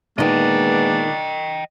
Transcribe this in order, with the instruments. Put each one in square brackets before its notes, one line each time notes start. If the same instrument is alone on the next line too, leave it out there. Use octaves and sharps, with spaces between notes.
[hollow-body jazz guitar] A#2 D#3 [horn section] G#3 A#3 B3 [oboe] D4 [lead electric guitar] D#5 G5